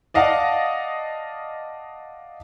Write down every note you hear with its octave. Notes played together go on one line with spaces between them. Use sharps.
D5 D#5 F5 F#5 A5